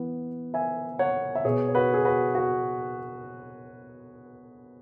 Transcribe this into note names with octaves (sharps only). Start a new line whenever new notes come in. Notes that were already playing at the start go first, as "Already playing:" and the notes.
Already playing: E3 B3
E5 G#5
C#5 F#5
E5
B2 B3 G#4 C#5
C#5
F#4 B4
G#4
F#4 B4
F#4